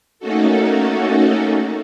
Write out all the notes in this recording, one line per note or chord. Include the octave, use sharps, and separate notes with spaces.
A3 A#3 C#4 D#4 F#4 A4